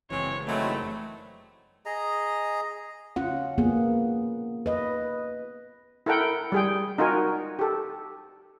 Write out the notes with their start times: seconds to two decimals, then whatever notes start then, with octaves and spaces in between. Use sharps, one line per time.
0.11 F#1 E3 G#3 C4 C#5
0.47 D#3 F#3 G#3 A3 C4 E4 D5
1.86 G#4 D#5 A#5
3.16 C#4 F4 F#5
3.58 A#3 B3 F4 G#4
4.66 B4 D#5
6.06 E4 A4 A#4 F#5 G5
6.52 G3 G#4 G5
6.98 D#4 F4 F#4 A#4 G#5
7.59 G4 A4